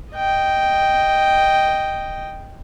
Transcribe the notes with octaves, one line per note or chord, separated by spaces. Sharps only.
D#5 G5